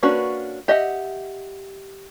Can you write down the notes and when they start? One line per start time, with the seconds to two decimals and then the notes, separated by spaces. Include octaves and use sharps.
0.03 A#3 C#4 D4 F#4 B4
0.68 G4 D#5 E5 F#5